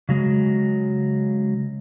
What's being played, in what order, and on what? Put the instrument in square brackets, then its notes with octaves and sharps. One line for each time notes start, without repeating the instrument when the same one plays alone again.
[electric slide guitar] C#3 F#3 G#3